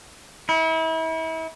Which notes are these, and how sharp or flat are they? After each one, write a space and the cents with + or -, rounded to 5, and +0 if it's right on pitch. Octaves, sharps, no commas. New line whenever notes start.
E4 -35